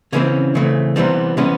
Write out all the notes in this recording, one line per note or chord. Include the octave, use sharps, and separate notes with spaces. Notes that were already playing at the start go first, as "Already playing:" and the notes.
C#3 E3 A3 C4 C#4
C#3 E3 A3 C4
C3 E3 G3 B3 C4
C3 E3 G3 B3 C#4